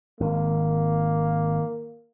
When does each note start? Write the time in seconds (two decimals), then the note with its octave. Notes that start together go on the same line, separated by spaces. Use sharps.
0.20 G#1 D#3 A#3